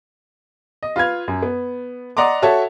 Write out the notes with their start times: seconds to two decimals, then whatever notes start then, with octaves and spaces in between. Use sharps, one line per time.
0.83 D#5
0.96 F4 B4 F5 G#6
1.28 F#2
1.42 B3
2.17 D5 D#5 F#5 A#5 C6 D6
2.42 F#4 A4 C#5 E5 A5